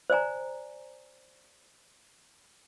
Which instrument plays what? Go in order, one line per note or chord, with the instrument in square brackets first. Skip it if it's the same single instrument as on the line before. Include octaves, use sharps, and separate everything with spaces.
[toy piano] C5 D5 G#5 A#5